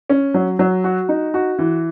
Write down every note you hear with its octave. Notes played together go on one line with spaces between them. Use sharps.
C#4
F#3
F#3
F#4
D#4
F#4
E3